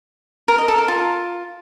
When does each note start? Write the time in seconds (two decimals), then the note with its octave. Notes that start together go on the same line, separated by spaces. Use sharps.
0.48 A#4
0.58 D#5
0.68 A4
0.78 A#4
0.88 F4